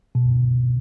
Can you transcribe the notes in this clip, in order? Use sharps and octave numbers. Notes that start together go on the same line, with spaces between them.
B2